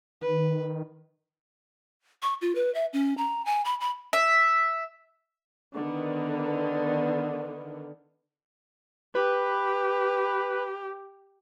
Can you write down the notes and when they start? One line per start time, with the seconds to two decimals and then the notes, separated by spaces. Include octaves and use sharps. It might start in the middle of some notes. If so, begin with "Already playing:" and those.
0.21 D#3 B4
2.22 C#6
2.41 F4
2.55 B4
2.74 E5
2.93 C#4
3.17 A#5
3.46 G#5
3.65 B5
3.81 B5
4.13 E5
5.75 D3 D#3 B3
9.15 G4 B4